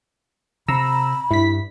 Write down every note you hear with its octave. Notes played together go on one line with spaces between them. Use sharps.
C3 A#5 B5 E6
G2 E4 B6